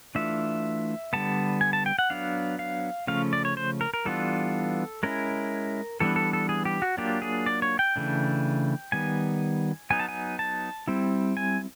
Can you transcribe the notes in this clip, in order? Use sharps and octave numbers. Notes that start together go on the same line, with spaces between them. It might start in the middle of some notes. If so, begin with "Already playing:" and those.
E3 A3 D4 F4 E5
D3 G3 B3 A5
G#5
A5
G5
F#5
F#3 B3 D4 F5
F5
C#3 F3 A3 C#4 F5
D5
C#5
C5
A#4
A#4
E3 G3 B3 D4 F4 A4
G#3 C#4 E4 A#4
E3 G3 B3 D4 A4
A4
A4
G#4
G4
F#4
F#3 A#3 D4 F4 G4
G#4
D5
C#5
G5
C#3 E3 A3 D4
D#3 G3 B3 G#5
F#3 B3 D#4 G#5
A5
G#5
A5
G3 C4 E4
G#5